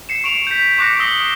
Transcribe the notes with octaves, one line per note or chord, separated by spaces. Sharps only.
C7 C#7 E7
C#6 D7 F7
G6 B6
C#6 D6 F#6 A#6 C#7 D7
D#6 E6 A#6 C7 G7